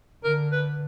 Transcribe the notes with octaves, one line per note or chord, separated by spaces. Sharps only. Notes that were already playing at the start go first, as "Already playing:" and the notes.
D3 A#4
B4